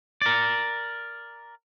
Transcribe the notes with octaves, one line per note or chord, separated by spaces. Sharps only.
A#4 D5